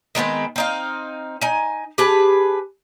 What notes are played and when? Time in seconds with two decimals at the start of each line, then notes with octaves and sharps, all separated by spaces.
0.15 D#3 G#3 B3 C4
0.56 C4 D#4 F5
1.42 D#4 G#5
1.98 G4 G#4 B4 A5